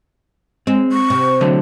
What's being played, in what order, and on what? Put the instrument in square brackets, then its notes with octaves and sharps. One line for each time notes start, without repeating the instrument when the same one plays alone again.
[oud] G#3 [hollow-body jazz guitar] C4
[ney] C#6
[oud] C3
[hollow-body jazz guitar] D3 F#3 A3